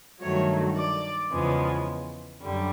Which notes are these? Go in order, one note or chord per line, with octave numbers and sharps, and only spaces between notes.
G2 D#3 F#3 A3 C#5
D5
E2 C#3 F3 G#3 B3
F#2 D3 G3